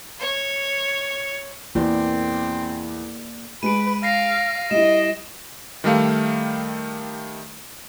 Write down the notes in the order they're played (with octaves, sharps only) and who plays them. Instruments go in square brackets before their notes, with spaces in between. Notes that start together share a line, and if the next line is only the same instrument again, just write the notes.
[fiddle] C#5
[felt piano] E2 [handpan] A#3 D5 [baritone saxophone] C4
[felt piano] G#3 [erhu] B4 [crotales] D7 D#7
[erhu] F5 [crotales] A#6 C7
[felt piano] G3 E4 [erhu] D#5 [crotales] E7
[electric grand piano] D#3 G3 A3 F5